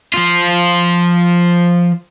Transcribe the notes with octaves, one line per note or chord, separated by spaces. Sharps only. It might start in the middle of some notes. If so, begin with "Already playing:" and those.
F3 F4